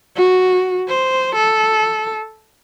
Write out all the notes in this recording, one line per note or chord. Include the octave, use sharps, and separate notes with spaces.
F#4
C5
A4